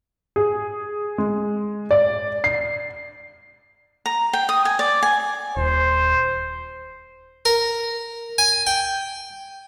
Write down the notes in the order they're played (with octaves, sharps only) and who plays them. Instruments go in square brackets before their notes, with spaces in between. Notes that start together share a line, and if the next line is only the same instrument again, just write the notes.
[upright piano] G#4
G#3
D5
C7
[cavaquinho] A#5
G5
D#6
G#5
D5
G#5
[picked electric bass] D#1 [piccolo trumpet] C5
[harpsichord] A#4
G#5
G5